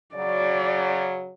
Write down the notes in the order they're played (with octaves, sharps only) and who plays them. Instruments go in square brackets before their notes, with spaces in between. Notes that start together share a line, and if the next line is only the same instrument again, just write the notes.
[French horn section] C#3 F#3 [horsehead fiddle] D5